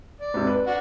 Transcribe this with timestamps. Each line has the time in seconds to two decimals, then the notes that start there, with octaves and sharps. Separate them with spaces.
0.21 D5
0.34 G#2 C3
0.47 B4
0.67 D4 F#4